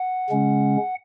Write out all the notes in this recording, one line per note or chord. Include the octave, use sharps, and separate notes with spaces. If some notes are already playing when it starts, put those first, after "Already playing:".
Already playing: F#5
C#3 G#3 C#4